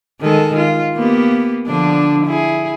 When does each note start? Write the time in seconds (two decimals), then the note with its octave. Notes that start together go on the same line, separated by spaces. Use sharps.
0.21 D#3 G#3 A4
0.57 F4
0.95 A#3 B3 G4
1.67 D3 F3 D4
2.25 E4 G#4